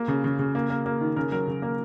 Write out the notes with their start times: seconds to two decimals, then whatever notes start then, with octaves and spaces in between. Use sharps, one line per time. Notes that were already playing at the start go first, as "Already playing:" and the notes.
Already playing: A#3
0.08 C#3
0.24 C#3
0.39 C#3
0.55 A#3
0.70 A#3
0.86 A#3
1.01 D#3
1.16 C#3 A#4
1.32 F#3 A#4
1.48 C#3
1.62 A#3 A#4